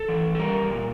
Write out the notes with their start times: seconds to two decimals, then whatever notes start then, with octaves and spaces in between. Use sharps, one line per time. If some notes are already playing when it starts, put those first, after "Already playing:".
Already playing: A4
0.08 E3
0.35 A4
0.39 G3 A#4
0.70 A#2